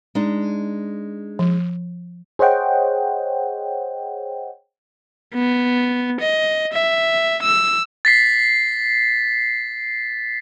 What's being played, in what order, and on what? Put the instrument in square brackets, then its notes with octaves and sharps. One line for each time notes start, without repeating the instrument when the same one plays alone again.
[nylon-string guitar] G#3 D4 D#4
[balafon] F3
[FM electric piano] G#4 C5 C#5 D#5 F#5 G5
[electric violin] B3
D#5
E5
E6
[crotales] A6 B6 C7